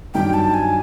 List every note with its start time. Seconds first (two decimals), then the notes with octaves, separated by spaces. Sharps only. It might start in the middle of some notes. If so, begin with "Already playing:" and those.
0.14 G2 D#3 F#3 G5
0.34 A5
0.54 G#5